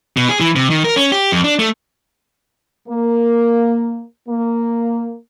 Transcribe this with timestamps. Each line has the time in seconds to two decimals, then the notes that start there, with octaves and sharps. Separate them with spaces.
0.17 B2
0.29 G#4
0.41 E3
0.56 C3
0.70 D#3
0.84 A#4
0.96 C#4
1.12 G4
1.32 F2
1.44 D4
1.59 A3
2.88 A#3
4.29 A#3